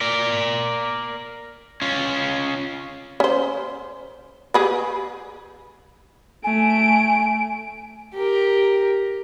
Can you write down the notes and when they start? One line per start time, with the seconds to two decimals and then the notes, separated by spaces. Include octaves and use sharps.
0.01 A#4 D5
1.82 C#4 F4
3.20 C#4 C5
4.54 G4 G#4 B4
6.44 A3 G#5 D7
8.15 G4 A#4